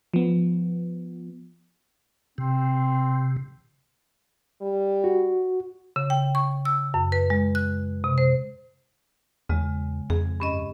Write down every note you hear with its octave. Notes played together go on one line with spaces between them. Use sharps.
F3 B3
C3 C4
G3
F#4
C#3
G5
C#6
E6
F#2
B4
G#3
F#6
C3
C5
E2 C#3 G#3
F2 G#4
G2 C#4 D#5